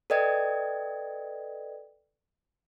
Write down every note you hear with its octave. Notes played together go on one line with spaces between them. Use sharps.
A4 B4 D5 D#5 G5 G#6